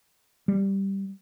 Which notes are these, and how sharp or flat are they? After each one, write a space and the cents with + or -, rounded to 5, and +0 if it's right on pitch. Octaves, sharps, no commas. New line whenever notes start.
G3 -5